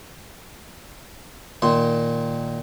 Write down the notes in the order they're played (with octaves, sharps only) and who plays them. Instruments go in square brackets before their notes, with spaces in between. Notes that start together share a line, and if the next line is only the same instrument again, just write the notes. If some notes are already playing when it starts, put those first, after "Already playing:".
[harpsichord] A#2 D#3 C6